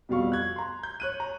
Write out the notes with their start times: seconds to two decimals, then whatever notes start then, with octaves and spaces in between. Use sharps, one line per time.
0.09 F2 B2 G3 F5 C#6
0.32 F#6 G#6
0.56 A#5 C6
0.83 G6
1.00 C#5 F#6 D#7
1.20 A#5